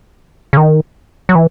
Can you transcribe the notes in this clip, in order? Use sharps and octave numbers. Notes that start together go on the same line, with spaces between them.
C#3
D#3
F#3
E3